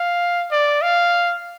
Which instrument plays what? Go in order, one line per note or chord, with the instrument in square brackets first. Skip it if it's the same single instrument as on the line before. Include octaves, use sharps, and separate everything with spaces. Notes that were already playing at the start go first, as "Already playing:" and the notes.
Already playing: [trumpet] F5
D5
F5